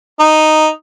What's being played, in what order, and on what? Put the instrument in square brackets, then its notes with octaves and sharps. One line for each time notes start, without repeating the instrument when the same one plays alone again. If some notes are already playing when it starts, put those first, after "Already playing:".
[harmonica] D#4